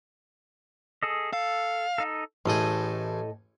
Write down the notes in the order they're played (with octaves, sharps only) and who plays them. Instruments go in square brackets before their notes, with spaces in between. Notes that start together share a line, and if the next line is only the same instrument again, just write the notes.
[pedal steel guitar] G#4 A4 D#5
[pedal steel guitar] A4 [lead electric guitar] F5
[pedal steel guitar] D#4 A4
[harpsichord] A1 G#4 [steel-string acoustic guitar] A2 A4 D#5